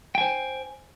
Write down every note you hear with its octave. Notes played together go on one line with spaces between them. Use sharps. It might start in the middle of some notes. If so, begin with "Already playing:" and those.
C5 G5 G#5